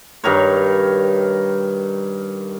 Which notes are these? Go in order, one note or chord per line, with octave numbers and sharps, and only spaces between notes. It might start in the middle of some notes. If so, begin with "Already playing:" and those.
G2 D#3 A#4 C#5